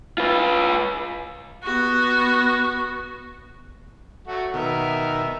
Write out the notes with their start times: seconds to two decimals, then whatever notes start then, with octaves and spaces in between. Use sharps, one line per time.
0.18 F4 B4
1.64 B3 F#4
4.27 F#3 A3 F#4
4.54 B2 D#3 B3 A#4 E5